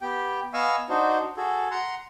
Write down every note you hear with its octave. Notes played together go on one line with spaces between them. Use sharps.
B3 G4 G5
B3 D#5 F5 G#5 C#6 E6
D4 D#4 F#4 C5
F#4 G#4 A4
F#5 A#5 C6